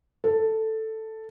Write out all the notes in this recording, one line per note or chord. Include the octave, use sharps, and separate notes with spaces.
A4